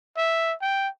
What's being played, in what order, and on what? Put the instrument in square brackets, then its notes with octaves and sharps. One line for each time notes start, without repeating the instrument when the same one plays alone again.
[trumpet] E5
G5